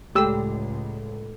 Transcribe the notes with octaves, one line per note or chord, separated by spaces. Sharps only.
C#2 A2 G#3 A3 G4 A4 E6